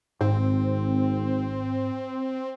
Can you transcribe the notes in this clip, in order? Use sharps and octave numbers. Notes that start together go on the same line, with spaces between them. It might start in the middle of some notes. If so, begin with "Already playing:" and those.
G#1 G#2 C4